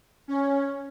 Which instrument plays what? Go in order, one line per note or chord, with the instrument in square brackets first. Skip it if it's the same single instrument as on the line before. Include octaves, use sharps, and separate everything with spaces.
[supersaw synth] C#4